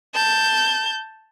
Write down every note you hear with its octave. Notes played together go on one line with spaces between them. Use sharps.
A5 G6